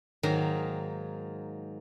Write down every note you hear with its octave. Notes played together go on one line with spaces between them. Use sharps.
G#2 D#3 F#3 A#3 A#5